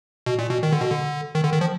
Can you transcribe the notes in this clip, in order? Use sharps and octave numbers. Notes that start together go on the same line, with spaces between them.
B2
A#2
B2
D#3
D3
B2
D3
D#3
D3
D#3
F3